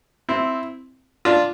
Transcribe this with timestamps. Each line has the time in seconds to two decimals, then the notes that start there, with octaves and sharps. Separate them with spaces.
0.29 C4 E4
1.25 D4 F4